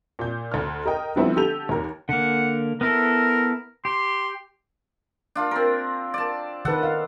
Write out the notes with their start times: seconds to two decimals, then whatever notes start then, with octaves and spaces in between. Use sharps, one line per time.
0.19 A#2 G6
0.52 D2 F6
0.86 A#4 D#5 G5
1.16 D3 F3 G3 B3 C4 E4
1.36 D3 G4 A4 G6 D#7 F7
1.69 D#2 A#4
2.09 D3 A#3 F#5
2.81 B3 E4 A4 A#4
3.85 G4 C6
5.35 D4 F4
5.51 C4 A#4
6.14 D5 A5
6.65 D#3 A4 B4 F#5
6.83 F5